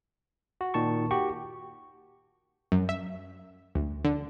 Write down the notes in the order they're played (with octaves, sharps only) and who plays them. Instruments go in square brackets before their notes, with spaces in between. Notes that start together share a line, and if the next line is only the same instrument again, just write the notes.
[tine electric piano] F#4
A#2 D#3 A5 C#6
F#4 G4 G5 C#6
[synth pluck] F#2
E5
D2
D3